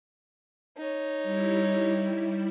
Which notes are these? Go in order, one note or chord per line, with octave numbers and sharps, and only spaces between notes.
D#4 C#5
G3 E4